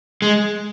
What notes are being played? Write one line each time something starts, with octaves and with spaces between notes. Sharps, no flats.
G#3